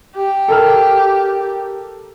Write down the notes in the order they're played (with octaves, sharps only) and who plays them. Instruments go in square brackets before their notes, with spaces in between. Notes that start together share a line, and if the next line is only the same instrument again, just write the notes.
[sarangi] G4
[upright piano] A4 A#4 F6